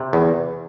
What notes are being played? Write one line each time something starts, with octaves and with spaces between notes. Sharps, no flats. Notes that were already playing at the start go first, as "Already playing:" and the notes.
Already playing: C3
E2